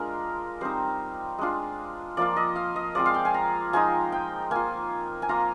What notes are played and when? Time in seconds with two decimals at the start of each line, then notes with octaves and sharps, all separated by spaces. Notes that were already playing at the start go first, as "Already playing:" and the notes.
Already playing: G#3 D4 F4 A#4
0.61 G3 C4 D#4 C5
1.38 G#3 D4 F4
2.17 F3 A#3 F4 D5
2.36 D#5
2.56 F5
2.76 D#5
2.95 F3 G#3 C4 F4 D5
3.06 F5
3.14 G5
3.25 G#5
3.34 A#5
3.73 F3 G#3 D#4 G#5
4.12 G5
4.51 A#3 F4 G#5
5.22 G#5
5.29 A#3 F4 A#5